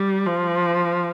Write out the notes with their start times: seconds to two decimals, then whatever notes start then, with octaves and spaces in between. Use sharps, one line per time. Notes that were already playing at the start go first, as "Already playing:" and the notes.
Already playing: G3
0.26 F3